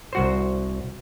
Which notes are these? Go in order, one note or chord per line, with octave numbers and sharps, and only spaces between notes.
C2 F#4 C5